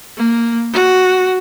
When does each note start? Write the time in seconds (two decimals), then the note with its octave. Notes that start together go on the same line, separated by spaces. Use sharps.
0.17 A#3
0.73 F#4